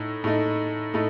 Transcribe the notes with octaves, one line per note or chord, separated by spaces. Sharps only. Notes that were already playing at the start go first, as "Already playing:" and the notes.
Already playing: A2 D#4
A2 A3 D#4
A2 A3 D#4